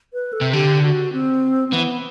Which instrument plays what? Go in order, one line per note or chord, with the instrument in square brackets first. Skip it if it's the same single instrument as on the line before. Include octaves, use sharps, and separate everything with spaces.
[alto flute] B4
A4
[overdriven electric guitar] C3
[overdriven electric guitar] D3 [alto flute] G4
[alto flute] F#4
C4
C4
[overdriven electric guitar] E3 [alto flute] B3